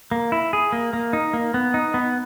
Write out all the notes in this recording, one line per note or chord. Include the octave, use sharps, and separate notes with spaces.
A#3
E4
G#4
A#3
A#3
D#4
A#3
B3
D#4
B3